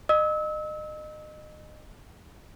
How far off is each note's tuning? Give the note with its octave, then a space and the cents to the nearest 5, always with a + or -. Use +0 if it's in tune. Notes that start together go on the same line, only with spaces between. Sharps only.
D#5 -30 E6 -35